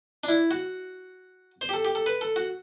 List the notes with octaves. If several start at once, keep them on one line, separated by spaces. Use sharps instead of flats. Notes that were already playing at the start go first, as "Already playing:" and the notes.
D4
E4
F#4
C5
G4
A4
G4
A4
B4
A4
F#4